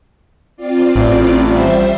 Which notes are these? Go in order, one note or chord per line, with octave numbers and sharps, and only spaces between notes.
C4 F4 D5
A1
G3 C5 E5